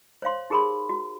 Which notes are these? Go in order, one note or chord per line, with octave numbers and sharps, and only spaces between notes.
C5 C#5 F5 C6
D#4 G4 G#4 A#4 B5 C6
F#4